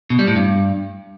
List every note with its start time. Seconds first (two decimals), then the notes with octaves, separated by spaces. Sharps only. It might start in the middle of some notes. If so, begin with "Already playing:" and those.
0.10 B2
0.19 G3
0.27 A2
0.36 G2